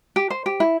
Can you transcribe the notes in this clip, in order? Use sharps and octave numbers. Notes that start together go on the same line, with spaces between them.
G4
C5
G4
E4